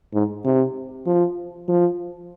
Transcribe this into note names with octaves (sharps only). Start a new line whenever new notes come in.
G#2
C3
F3
F3